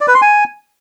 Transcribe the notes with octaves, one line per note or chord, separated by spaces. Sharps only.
D5
B4
C6
G#5